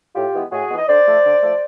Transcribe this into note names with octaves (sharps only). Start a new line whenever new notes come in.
A2 F4 G4
E3 G#3 B3
A2 F#4 G#4
E3 G#3 B3
D#5
D3 C5 D5
F3 A3
D3
F3 A3